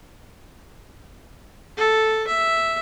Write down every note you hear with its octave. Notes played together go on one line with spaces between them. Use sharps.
A4
E5